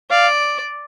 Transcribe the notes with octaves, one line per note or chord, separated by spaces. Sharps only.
D5 F5